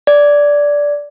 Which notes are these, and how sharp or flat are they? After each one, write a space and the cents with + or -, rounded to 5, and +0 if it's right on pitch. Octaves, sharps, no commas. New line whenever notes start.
D5 -10